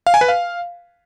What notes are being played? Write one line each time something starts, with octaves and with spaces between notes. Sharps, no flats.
F5
G#5
B4
F5